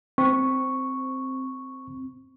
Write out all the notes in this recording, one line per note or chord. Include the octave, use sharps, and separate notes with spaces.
C4 C#6